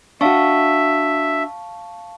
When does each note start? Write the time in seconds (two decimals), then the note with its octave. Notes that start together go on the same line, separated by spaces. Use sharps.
0.21 D4 F#4 E5 F5 A5 C#6